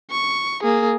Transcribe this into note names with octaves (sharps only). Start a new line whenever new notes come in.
C#6
A#3 G#4